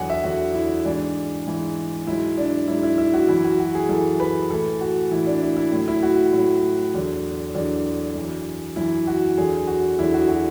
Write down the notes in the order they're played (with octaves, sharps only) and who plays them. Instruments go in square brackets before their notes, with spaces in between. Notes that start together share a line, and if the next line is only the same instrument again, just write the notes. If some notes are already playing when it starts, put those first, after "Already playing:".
Already playing: [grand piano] E2 D3 F#3 F#5 G#5
E5
E2 D3 F#3 F#4
E4
G#2 E3 D4
G#2 E3
G#2 F#3 E4
D4
G#2 F#3 E4
E4
E4
F#4
F#2 E3 E4
F#4
F#4
G#4
F#2 E3 A4
B4
A2 E3 A4
F#4
A2 E3 E4
D4
E4
E4
A2 F#3
E4
F#4
A2 F#3
E2 D3 F#3
E2 D3 F#3 D4
F#2 E3
F#2 E3 E4
F#4
E2 D3 F#3 G#4
F#4
E2 D3 F#3 E4
F#4
F#4